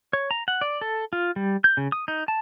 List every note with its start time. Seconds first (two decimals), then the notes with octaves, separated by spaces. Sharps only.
0.13 C#5
0.31 A#5
0.48 F#5
0.61 D5
0.81 A4
1.13 F4
1.36 G3
1.64 G6
1.77 C#3
1.92 D#6
2.08 D#4
2.28 A5